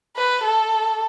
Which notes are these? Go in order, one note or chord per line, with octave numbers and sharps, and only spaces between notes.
B4
A4